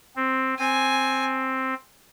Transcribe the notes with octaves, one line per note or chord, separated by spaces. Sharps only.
C4
C4 G#5